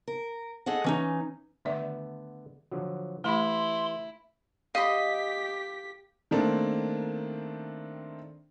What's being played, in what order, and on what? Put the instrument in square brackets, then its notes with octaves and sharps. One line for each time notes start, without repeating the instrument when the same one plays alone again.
[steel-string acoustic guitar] A#4
G#4 A4 D#5 F#5
E3 C#4 D#4
[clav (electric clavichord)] D3 A3 B3 [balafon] D#3 D5 E5
[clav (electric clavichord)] D3 F3 F#3
[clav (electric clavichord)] E3 G4 [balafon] A3 B5 [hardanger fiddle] E4 [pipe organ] C6
[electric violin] G4 B6 [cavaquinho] D#5 B5 [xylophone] F5
[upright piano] D#3 A3 A#3 C4 D4